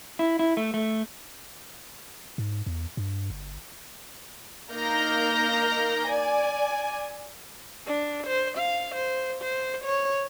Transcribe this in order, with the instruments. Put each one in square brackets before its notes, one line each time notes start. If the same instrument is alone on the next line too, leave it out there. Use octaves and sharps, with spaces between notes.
[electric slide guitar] E4
E4
A3
A3
[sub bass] G#2
E2
G2
G1
[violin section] A#3 D#4 A#4 F6 G6 A#6
D5 G#5
[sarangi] D4
C5
F5
C5
C5
C#5